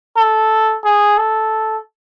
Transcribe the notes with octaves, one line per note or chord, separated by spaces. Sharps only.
A4
G#4
A4